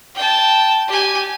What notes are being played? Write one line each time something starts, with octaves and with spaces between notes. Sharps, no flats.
G5 A5
G4 G#5